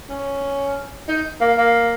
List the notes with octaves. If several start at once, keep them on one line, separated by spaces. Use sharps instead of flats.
C#4
D#4
A#3
A#3